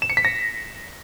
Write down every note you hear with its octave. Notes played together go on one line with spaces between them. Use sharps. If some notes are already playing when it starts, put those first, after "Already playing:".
E7
C#7
B6
A#6